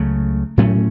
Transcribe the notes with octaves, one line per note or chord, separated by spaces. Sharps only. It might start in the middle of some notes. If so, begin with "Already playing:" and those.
Already playing: C#2 C#3 F#3 A3
A2 F#3 A3 C#4